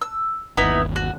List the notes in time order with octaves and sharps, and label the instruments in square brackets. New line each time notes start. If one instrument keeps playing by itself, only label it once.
[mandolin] E6
[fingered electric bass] G1 D#2 [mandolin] B3 D#4 E4
[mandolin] F#4